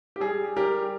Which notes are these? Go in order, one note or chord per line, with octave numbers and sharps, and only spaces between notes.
G4
G3 G#4
G3 G4 A#4